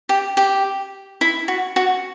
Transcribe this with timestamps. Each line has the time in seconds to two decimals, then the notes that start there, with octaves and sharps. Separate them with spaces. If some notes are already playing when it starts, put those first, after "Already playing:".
0.09 G4
0.37 G4
1.21 E4
1.48 F#4
1.76 F#4